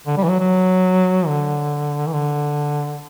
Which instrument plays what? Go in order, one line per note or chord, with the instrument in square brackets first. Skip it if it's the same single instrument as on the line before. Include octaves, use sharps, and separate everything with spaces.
[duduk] D3
G3
E3
F#3
F#3
D3
E3
D3